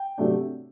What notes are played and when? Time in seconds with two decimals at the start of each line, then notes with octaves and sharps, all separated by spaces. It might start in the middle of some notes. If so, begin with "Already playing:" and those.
Already playing: G5
0.18 C3 F#3 A3 D4